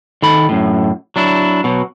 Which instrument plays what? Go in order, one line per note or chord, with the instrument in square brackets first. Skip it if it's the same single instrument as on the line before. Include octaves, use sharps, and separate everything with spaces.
[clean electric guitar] D#3 A4 B5
F#2 A2
F#3 D4 E4
B2 F#3